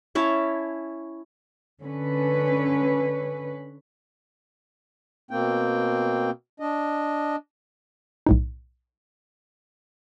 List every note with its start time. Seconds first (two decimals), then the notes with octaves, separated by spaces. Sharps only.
0.15 C#4 E4 C#5 A5
1.81 D3 C#4 B4
5.31 B2 A#3 C4 G5
6.60 D4 D#5
8.26 B1 A2 D#4